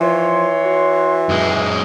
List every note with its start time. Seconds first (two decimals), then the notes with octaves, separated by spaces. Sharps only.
0.01 E3 F3 C#5 C6
0.65 F#4
1.29 F#2 G#3